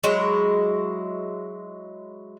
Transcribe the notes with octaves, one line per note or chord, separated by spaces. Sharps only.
F#3 G#3 E4